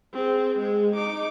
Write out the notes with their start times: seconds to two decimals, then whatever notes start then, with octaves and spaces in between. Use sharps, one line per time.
0.13 C4 G#4
0.59 G#3 G#4
0.96 D#4 D6